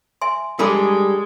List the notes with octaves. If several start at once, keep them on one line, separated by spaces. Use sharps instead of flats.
E5 G#5 C6
G3 G#3 D4 G#4 A4 B5 D6